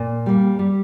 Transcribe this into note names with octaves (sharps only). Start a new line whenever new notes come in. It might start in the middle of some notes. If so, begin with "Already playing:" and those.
Already playing: A#2
G3 A#3
G3